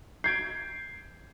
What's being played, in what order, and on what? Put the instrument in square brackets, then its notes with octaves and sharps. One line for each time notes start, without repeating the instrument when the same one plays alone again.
[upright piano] G6 G#6 D7 [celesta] C7